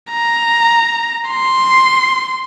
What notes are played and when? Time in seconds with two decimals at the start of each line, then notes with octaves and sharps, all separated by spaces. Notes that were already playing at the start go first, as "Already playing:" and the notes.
0.11 A#5
1.29 C6